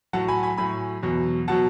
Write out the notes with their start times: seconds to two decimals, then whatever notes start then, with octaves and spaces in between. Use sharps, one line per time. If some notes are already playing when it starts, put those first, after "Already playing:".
0.13 A2 F#3 F#5 A5
0.28 G#5 B5
0.43 G#5 B5
0.57 A2 F#3 G#5 B5
1.03 E2 B2 F#3
1.48 B2 F#3 F#5 A5